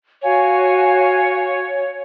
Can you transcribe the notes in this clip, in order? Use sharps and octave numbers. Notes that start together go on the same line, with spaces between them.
F#4 C#5 F5 G#5